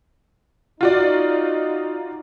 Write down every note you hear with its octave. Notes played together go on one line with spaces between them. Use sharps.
D#4 F4 F#4 D5